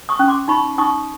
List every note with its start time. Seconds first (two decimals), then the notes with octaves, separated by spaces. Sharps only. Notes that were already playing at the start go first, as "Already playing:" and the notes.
0.09 C#6 D#6
0.19 C#4
0.28 C6 D6
0.48 D#4 B5 C#6
0.78 D#4 C#6 D#6